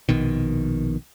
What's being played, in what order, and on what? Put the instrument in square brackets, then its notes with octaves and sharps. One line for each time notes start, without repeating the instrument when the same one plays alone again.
[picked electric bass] A#1 B2 D#3